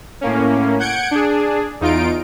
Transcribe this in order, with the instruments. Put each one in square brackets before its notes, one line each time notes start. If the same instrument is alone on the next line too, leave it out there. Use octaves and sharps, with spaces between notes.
[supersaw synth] A2 A#3 C#4
F#5 G6 G#6 C#7 D7
D4 G#4
E2 D#4 F4 D7